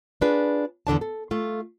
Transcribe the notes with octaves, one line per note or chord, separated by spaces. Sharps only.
D4 F4 G#4 B4
E2 D3 D4 A5
A4
A3 F4